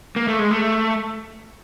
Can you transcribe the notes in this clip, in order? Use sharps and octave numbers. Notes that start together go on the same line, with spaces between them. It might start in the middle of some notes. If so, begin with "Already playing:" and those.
A#3
A3
G#3
A3